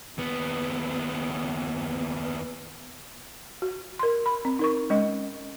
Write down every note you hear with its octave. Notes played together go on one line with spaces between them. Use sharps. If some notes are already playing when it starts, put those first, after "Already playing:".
D#2 B3
F#4
A#4 C6
B5
C4
D#4 A#4 C#6
G#3 C#4 D#5